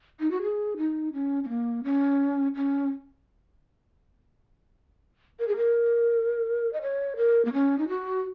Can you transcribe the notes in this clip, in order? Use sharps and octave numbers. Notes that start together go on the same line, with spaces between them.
D#4
F#4
G#4
D#4
C#4
C#4
A#3
C#4
C#4
A#4
G#4
A#4
D#5
C#5
A#4
A#3
C#4
D#4
F#4